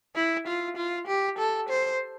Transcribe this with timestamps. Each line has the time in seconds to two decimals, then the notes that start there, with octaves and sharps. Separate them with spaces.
0.16 E4
0.47 F4
0.77 F4
1.08 G4
1.38 A4
1.69 C5